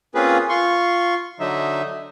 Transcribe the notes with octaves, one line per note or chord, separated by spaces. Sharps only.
A#3 C4 C#4 F4 G#4 B4
F4 C6 C#6
D3 F#3 D#4 E5